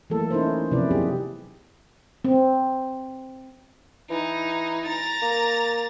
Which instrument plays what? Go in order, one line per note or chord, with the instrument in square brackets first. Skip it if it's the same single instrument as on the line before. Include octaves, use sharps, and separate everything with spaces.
[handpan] E3 F#3 A3 A#3 A4
C#4 D#4 E4 A4 A#4 C5
C3 F3 C#4 E4 B4 D5
F#3 B3 D#4 E4 G4 G#4
C4
[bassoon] E3 [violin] D#4
[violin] A#5 A6
[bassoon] A#3